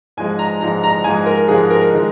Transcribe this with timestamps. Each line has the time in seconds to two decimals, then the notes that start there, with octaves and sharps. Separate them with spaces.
0.17 G#2 F3 G#3 G#5
0.39 A#5
0.61 G#2 F3 G#3 A#5
0.83 A#5
1.04 G#2 F3 G#3 G#5
1.26 A#4
1.48 G#2 F3 G#3 G#4
1.70 A#4
1.93 D#3 G#3